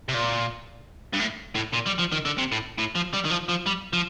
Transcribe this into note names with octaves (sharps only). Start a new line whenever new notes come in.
C3
A#2
G2
A2
A2
A#2
G3
F3
D#3
D3
C3
A2
A2
F3
G3
D#3
F3
F3
G3
F3